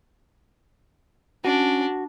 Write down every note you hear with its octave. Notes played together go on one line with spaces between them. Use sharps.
C#4 D4 F#4